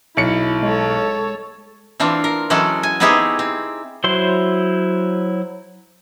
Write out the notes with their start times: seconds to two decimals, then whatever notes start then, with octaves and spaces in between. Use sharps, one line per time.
0.17 B1 E4 C#7
0.63 G#3 A4 C#5
2.00 E3 C4 D4 F4
2.24 A#4
2.50 E3 F#3 G#3 C#4 F#4 A4
2.83 G#5
3.00 B3 C4 D#4 E4 G4 G#4
3.39 C4
4.04 F#3 E4 C5 C6